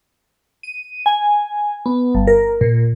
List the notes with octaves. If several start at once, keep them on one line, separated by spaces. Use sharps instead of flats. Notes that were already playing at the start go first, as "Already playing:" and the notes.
D#7
G#5
B3
G1
A#4
A#2